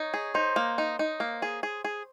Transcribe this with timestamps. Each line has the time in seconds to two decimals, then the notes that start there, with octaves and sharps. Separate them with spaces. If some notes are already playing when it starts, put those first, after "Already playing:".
Already playing: D#4 C#5
0.14 G#4
0.34 D#4 C5
0.56 A#3
0.78 D#4
0.99 D#4
1.20 A#3
1.42 G#4
1.63 G#4
1.84 G#4